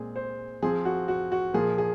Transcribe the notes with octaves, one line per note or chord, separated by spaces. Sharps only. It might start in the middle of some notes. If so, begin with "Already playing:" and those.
Already playing: A#2 G#3 C4 G#4
C5
F3 C4 G#4
F#4
F#4
F#4
A#2 F3 A#3 G#4
G#4